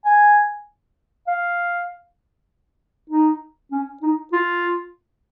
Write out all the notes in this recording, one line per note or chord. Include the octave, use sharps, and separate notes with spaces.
G#5
F5
D#4
C#4
D#4
F4